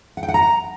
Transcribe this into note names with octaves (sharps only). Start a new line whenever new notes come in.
F#5
G5
F#5
A#5